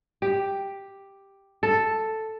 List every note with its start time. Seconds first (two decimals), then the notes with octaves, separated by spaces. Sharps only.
0.22 G4
1.63 A4